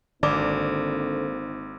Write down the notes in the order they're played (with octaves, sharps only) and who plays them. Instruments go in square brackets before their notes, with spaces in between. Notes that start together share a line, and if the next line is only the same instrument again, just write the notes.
[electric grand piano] G#1 [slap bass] D3 [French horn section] A#3 C4 D#4 [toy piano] D5 D6